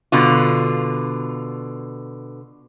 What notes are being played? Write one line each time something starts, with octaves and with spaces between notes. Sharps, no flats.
B2 D3 F4